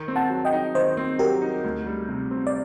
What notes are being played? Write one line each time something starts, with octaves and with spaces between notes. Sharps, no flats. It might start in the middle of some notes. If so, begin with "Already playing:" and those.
Already playing: D#3
C4
F#5 A5
F#3
D#5 G5
D#4
D#3 C5 D#5
C4
F#3 G4 A#4
D#4
D2
G3
C3
C4
D5